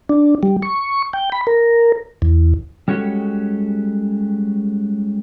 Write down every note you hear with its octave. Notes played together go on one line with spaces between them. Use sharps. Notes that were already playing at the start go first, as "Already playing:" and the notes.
D4
G3
C#6
G5
B5
A#4
E2
G3 G#3 C#4 F#4 G4 A4